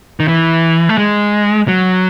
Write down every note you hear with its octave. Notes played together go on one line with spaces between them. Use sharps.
D#3
E3
A3
G#3
F#3